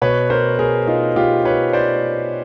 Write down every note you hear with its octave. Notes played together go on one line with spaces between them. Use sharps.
B2 B4 C#5
A#4 C5
G#4 A#4
D#4 F4
F4 G4
B4 C#5
C5 D5